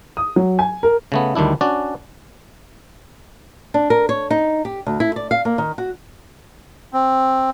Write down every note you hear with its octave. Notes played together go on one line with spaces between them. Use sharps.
D#6
F#3
G#5
A#4
C#3 A3 B3
D2 D#3 G3 D4 E4
C#4 D4 F#4 D5
D4
A#4
C#5
D#4
G4
D2
E4
D5
F5
A#3
D#3
F#4
C4